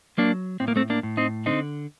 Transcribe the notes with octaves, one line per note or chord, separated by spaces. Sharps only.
F#3 A#3 D4
A2 C4
A#3
A3 C4
A#3 D4
A2
C4 D#4
D3 C4 D#4